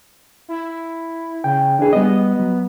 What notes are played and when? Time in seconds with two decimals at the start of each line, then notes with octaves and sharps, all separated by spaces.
0.48 E4
1.44 C#3 G5
1.79 E3 D4 G#4
1.93 G3 B3 D#5
2.39 F#3